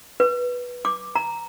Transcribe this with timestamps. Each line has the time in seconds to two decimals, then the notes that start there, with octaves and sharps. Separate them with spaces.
0.20 B4
0.85 D6
1.15 A#5